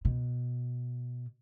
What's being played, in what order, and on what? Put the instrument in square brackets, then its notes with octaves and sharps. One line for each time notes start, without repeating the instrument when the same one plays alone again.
[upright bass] B2